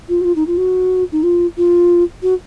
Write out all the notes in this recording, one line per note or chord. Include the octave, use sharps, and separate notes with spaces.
F4
F#4
F4
D#4
F4
F#4
D#4
F4
F4
F#4